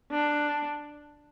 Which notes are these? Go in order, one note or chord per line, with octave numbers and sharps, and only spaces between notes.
D4